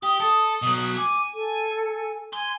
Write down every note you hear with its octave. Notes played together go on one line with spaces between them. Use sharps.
G4 D#6
A4 D#6
B2 F#3
G#5 D6
A4
G#5 C6